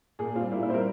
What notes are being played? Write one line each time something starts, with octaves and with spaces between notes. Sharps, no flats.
A#2 G#4
G3 C4 F4
A#2 E4
E4
G3 C4 A#4 C5